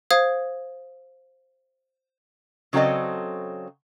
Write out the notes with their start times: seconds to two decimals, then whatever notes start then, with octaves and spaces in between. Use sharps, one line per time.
0.11 C5 F5 D#6 G#6
2.73 C#3 F#3 C4 A4 D5 D#5